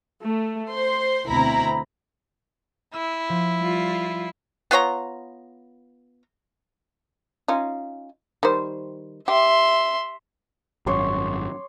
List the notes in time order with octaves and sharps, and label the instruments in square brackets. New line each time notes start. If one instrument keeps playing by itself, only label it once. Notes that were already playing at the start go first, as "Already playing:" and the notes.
[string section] A3
C5 C6
D2 B2 C4 E4 A#5 B5
[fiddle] E4 [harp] E6
[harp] F3
[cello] G3 F4
[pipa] B3 F4 C#5 A#5
[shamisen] C#4 D#4 F4
D#3 G3 C5
[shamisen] G4 [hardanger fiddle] E5 C6
[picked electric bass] G#1 F#2 [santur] C#5 C6 D6